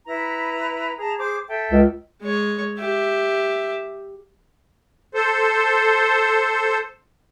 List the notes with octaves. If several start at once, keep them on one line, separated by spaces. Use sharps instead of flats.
E4 B4 A#5
G#4 A5 A#5
G#4 C5 D6
A4 E5 G5
C#2
G#3 C#5
G4 E5
A4 C5